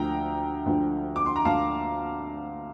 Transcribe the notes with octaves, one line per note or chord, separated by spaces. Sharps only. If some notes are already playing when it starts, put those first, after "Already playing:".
Already playing: D2 D3 F3 G5 A#5
D2 D3 F3
D6
C6
A#5
D2 D3 F3 F5 A5